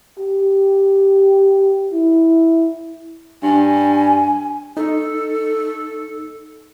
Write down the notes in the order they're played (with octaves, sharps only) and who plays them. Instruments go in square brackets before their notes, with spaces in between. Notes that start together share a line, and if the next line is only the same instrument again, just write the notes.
[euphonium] G4
E4
[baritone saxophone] G2 [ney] G#5
[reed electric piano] D#4 [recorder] A4